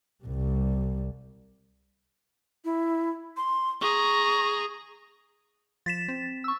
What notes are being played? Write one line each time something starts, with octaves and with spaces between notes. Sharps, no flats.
C2 G3
E4
C6
G#4 A#5 C#6
F3 A6 B6 E7
C4
C#6 E6